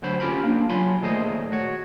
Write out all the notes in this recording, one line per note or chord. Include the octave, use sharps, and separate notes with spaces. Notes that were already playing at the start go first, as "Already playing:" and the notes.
D2 D3 F#3 C5 B5
C#4 F4 G4 A#4 B5
A#3 D4 F4
F#3 F4 G#5 B5 C6
D#2 A#2 A3 G#4 C5 D#5
F#4 C#5